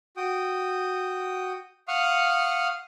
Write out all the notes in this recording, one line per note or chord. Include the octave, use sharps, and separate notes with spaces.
F#4 G5 D#6
F5 F#5 C#6 D#6 F6